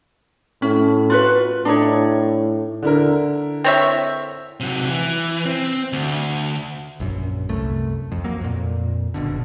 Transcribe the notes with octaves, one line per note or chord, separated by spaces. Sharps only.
A2 C#4
F4 F#4 B4
A2 D4 D#4 C#5
D3 E4 A#4
C4 C#5 E5
C3 F#3
E3
C4
D2
A#1 F#2
C2 F#2 A3
F2
F#3 A#3
F2 A#2
F#1 B2 D3